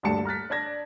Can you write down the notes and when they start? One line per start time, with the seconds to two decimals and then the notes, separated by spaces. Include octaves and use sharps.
0.03 D#1 D2 G2 D4 A5 C#7
0.25 A#5 F6 F#6 A6 B6
0.50 D4 D5 A5 G#6 A#6